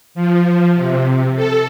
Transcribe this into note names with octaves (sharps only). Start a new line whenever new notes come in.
F3
C3
A4